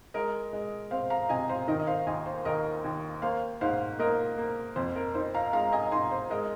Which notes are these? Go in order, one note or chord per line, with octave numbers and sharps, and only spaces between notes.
G#3 A#4 D#5
G#3
C4 C5 F5
F5 A#5
C3 D#5 G#5
C5 F5
D#3 A#4 D#5
D#5
C5 F5
D#2 D#5 G#5
C5
D#2 A#4 D#5
D#2
A#3 C5 F5
G#2 C5 F5
A#3 A#4 D#5
A#3
F2 C5
A#4
D#4 C5
F5 A#5
G#3 F5 A#5
D#5 G#5
D#4 G#5 C6
C5
G#3 A#4 D#5